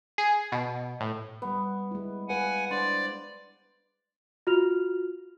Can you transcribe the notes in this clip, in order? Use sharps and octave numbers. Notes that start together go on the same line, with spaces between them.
G#4
B2
A2
G3 B3 B4
G#3 E4
B4 F5 F#5 G#5
D4 C5 D5
F4 F#4 F6 F7